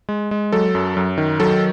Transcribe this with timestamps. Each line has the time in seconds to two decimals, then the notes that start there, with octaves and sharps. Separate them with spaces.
0.09 G#3
0.31 G#3
0.52 F#3 A4
0.75 F#2
0.97 F#2
1.18 D#3
1.40 F#3 A4